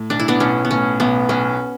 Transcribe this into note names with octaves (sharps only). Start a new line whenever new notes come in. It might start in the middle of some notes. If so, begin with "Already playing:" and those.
Already playing: A2
B1 D4
E4
B3 D4
B1 C#4
B3
A2 C#4
B1 B3
B1 C#4